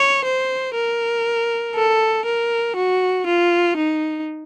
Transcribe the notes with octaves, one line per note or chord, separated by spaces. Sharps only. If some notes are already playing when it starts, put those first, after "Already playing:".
Already playing: C#5
C5
A#4
A4
A#4
F#4
F4
D#4